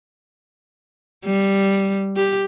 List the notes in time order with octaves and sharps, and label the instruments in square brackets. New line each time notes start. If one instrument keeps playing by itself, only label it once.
[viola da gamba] G3
G4